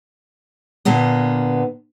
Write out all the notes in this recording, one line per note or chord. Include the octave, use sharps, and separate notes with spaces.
A#2 D3 A#3 B3